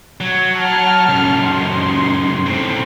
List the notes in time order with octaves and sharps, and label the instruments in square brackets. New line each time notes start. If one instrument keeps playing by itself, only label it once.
[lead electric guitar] F#3
[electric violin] A5 F6
[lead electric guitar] C#2 F#2
[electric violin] D#4 C6
[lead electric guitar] A2 C4